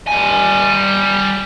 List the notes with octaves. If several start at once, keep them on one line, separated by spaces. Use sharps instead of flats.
G3 G#5